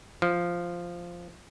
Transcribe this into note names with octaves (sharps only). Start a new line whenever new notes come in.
F3